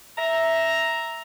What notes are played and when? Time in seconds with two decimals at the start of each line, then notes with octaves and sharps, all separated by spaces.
0.18 E5 A#5